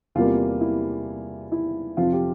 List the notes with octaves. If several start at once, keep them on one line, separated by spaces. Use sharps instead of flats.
E2 C3 G3 A#3 F4
E4
E4
F2 C3 F3 F4
G4